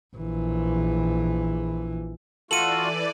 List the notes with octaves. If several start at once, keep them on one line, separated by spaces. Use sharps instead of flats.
A#1 E3
E3 A3 F4 F#4 A4 D5 D#7 F#7